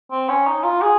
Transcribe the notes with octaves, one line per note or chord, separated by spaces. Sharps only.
C4
C#4
D#4
F4
G#4